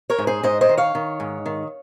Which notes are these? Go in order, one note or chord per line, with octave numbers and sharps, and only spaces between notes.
A#4 C#5
G#2
G#4 C5
G#2 C5 D#5
C5 D#5
D#3
C#5 F5
D#3
G#2
D#3